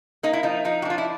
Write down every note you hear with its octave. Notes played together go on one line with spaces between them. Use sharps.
A#3 D#4
E4
F3 D#4
F3 D#4
F#4
D4 F4
E4